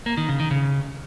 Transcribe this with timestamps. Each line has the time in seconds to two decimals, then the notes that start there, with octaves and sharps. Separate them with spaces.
0.06 A#3
0.17 D#3
0.29 C#3
0.40 D#3
0.51 C#3